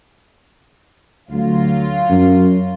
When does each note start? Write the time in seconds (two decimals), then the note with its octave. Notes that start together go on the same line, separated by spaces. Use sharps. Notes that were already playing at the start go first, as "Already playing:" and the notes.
1.31 D2 F#3 F4
2.09 F#2